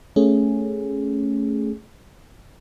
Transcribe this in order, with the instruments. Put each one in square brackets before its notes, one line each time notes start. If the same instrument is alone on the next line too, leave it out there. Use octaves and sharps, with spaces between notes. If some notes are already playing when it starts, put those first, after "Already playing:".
[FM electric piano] A3 C#4 G#4